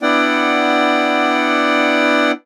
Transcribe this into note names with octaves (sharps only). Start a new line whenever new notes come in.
B3 D4 E4 D5 F#5 G5